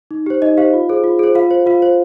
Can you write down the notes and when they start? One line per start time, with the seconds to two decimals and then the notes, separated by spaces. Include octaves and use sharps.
0.11 D#4
0.26 G4 C5
0.42 D#4 D#5
0.57 G4 C5 F5
0.73 F4
0.89 G#4 C5
1.04 F4
1.19 G#4 C5
1.35 F4 F5
1.51 C5
1.66 F4 F5
1.82 C5